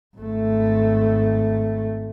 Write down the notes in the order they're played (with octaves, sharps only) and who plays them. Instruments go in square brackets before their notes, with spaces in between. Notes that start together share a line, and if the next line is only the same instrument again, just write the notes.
[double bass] G#1 A3